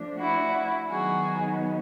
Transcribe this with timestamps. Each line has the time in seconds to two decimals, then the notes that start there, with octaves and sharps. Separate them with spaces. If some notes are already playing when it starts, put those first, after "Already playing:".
Already playing: F3 A3 D4
0.19 E4 F#4
0.88 D#3 F#3 B3 D#4 F#4 G#4